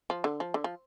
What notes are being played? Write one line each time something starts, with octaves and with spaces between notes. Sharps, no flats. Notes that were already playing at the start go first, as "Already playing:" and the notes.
F3
D3
F3
D3
F3